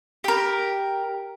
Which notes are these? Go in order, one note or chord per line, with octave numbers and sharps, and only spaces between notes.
G4 A#4